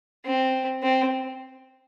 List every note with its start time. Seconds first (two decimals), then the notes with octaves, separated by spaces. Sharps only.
0.25 C4
0.83 C4